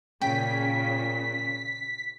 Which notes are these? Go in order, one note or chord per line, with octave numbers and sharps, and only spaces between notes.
A#2 C#3 G5 B6